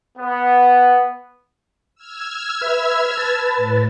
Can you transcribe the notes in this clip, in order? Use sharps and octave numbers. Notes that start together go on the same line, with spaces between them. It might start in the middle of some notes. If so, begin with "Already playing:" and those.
B3
E6 F6 G#6
B4 E5
B4 A5
A2